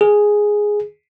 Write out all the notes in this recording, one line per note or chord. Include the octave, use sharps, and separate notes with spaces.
G#4